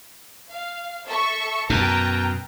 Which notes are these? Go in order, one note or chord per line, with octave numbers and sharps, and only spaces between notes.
F5
A4 E5 C#6
F#2 B2 G5 A5 A#5